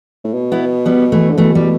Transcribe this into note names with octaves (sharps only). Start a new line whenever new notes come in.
A2
B2
B3 E4
G3 B3
E3 A3
D3
B2 E3 A3
G3